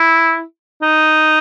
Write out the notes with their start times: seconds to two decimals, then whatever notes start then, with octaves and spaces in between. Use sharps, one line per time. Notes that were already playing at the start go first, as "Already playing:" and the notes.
Already playing: E4
0.82 D#4